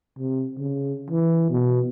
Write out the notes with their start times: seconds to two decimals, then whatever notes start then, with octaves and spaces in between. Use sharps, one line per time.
0.19 C3
0.58 C#3
1.11 E3
1.50 B2